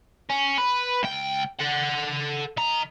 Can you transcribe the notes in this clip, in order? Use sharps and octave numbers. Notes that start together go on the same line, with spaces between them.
C#4
B4
C#2 G5
A4 F#5
D#3 A#5